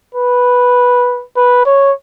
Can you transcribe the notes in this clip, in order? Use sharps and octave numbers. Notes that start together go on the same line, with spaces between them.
B4
B4
C#5